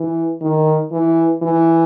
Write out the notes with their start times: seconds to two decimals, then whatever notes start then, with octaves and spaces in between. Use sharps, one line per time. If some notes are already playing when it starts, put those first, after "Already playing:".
Already playing: E3
0.42 D#3
0.92 E3
1.42 E3